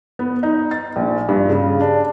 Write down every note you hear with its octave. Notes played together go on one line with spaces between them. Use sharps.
B3
D#4
A6
A#1
G2
C#3
D4